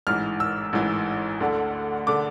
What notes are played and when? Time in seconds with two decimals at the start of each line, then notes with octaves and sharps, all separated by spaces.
0.07 A1 G#2 E3 F6
0.40 E6
0.73 A1 G#2 E3
1.40 D2 D3 A3
2.07 D3 A3 D6